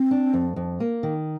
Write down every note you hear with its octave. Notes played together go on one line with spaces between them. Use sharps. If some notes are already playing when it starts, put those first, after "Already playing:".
Already playing: C4
D4
F2
F2
A#3
D#3